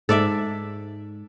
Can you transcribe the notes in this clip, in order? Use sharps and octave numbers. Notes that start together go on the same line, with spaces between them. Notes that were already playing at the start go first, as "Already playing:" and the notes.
G#2 A4 D5 E5